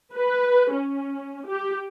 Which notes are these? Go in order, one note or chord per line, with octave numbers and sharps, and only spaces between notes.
B4
C#4
G4